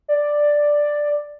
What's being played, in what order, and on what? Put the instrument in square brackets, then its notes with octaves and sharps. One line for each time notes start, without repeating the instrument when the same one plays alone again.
[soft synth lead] D5